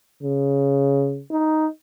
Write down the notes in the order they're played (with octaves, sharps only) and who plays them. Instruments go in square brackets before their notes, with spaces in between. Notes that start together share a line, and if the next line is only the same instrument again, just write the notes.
[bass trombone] C#3
D#4